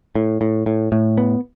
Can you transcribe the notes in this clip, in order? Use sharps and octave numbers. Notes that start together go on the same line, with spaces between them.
A2
A2
A2
A2
B3